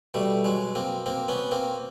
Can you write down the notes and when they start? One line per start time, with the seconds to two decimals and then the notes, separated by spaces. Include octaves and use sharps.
0.14 B2 G3 A3
0.44 F#3 G#3
0.75 A#3 C4
1.06 A#3 C4
1.28 B3 C#4
1.51 A#3 C4